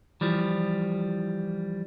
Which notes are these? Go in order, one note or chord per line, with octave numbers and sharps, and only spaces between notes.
E3 F3 G3